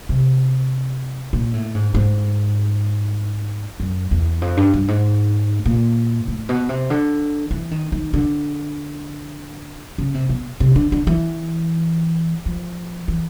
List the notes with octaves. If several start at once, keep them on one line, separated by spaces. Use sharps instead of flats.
C3
A#2
A2
G#2
G#2
F#2
E2
F2
G2
G2
G#2
A#2
A2
B2
C3
D3
E3
D#3
D#3
D3
C#3
C3
B2
C3
D3
D3
E3
F3
E3